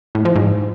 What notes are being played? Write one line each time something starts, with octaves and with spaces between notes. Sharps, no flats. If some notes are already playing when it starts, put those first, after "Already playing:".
A2
F3
G#2